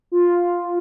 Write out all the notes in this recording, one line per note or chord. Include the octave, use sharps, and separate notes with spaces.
F4